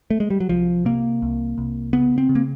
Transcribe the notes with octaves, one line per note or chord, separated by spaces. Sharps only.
A3
G#3
G3
F#3
C2 F3
C3 A#3
C2
C2
C#3 B3
C4
C#3
A#3